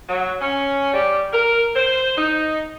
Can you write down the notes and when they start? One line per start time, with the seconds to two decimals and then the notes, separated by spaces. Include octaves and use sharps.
0.09 F#3
0.40 C#4
0.93 G3
1.33 A#4
1.75 C5
2.17 D#4